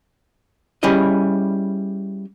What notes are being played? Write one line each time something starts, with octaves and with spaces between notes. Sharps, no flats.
G3 C#4 E4 G#4 D#5